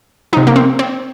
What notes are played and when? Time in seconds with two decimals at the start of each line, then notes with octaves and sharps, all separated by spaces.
0.33 F3 D#4
0.37 C3
0.47 A#3
0.56 C4
0.79 C4